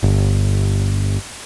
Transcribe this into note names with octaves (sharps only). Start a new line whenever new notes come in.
G1